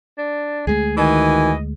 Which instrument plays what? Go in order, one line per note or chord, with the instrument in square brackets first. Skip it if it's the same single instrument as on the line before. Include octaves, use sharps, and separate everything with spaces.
[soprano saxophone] D4
[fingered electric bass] D2 G#3 A3 [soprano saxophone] G#4
[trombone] D#3 [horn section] E3 F#4 G#5 [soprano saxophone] D#5